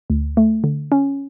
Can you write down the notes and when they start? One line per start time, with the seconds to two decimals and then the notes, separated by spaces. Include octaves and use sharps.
0.10 D2
0.37 A3
0.64 D3
0.92 C#4